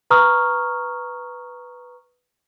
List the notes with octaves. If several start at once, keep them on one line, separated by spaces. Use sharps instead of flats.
B4 A#5 C#6 D#6 F6